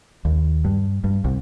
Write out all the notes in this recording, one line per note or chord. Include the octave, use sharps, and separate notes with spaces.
D#2
G2
G2
C2